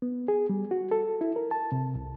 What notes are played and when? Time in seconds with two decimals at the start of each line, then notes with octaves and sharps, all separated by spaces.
0.02 B3
0.28 G#4
0.49 G3
0.71 F#4
0.91 A4
1.21 E4
1.36 A#4
1.51 A5
1.72 C3
1.95 C2